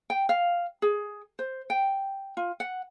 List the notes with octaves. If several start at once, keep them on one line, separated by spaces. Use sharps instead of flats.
G5
F5
G#4
C5
G5
F4
F#5